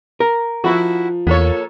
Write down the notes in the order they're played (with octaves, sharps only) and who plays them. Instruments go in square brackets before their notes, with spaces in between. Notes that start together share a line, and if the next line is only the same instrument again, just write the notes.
[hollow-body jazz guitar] A#4
[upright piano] F3 [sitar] E4 F#4
[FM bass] E2 [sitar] A#3 A4 C#5